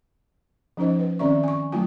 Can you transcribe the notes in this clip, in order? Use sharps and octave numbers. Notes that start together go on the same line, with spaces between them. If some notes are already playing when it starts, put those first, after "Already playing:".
F3 C#4 D#4 C5 D#5
B4
D#3 C4 C#4 D5 E5 C#6
G#5 C#6
F#3 A3 E4 F4 G#5